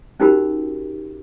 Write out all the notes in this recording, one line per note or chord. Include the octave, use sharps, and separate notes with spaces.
C#4 D#4 F#4 G4 A#4 B5